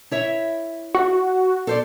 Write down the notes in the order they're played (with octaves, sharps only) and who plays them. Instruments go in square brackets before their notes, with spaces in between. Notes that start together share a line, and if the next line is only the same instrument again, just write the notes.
[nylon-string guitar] E4 C#5 E5
[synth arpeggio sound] F#4
[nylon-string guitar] A4 C5 D5